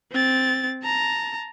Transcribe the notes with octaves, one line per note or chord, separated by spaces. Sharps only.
C4 A6
A5 A#5